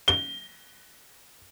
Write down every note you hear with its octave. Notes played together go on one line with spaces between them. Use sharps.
G7